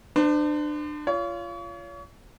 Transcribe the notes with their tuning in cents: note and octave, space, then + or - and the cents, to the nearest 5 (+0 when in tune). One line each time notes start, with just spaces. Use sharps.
D4 +30 C5 -35
F4 -20 C#5 +35